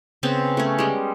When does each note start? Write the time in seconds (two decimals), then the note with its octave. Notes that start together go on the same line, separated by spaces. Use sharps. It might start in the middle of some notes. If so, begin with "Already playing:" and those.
0.23 C#3 B3 C4
0.57 A3 C#4
0.78 G3 G#3